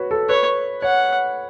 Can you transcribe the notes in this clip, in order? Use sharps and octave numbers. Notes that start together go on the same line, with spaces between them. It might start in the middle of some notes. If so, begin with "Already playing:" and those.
Already playing: F#4 B4 C#5
A4
B4 C#5
C#5 F#5